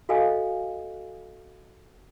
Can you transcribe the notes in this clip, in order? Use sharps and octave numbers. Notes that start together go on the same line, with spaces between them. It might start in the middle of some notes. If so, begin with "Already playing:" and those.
F#4 A4 D#5 F5 G#5